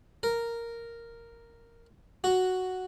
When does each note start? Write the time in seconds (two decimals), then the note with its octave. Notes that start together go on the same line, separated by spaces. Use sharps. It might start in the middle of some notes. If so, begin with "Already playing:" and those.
0.23 A#4
2.24 F#4